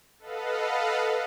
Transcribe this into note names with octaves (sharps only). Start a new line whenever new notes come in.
A4 B4 D#5 F5 F#5